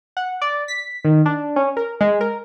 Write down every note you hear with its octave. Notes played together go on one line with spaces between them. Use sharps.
F#5
D5
B6
D#3
D4
C#4
A#4
G#3
A#4